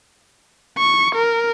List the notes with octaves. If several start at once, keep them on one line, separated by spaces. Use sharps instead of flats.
C#6
A#4